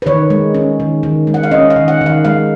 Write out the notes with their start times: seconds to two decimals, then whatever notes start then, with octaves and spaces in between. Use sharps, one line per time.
0.02 B4
0.06 D#3 C#5
0.30 G#3
0.55 C#4
0.80 D#3
1.03 D#3
1.27 G#3
1.34 F#5
1.43 F5
1.51 C#4 D#5
1.70 F5
1.76 D#3
1.88 F#5
2.01 D#3
2.06 F5
2.25 G#3 F5